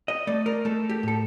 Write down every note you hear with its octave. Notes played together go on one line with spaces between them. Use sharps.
D#5
A3 D5
A#4
A3 A4
G4
A2 A4